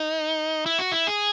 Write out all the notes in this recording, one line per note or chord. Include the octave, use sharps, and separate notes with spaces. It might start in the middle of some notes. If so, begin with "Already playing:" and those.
Already playing: D#4
E4
F#4
E4
G#4